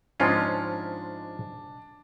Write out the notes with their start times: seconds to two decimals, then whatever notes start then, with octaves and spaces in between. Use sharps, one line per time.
0.20 G#2 F3 G#3 C#4 D4 F4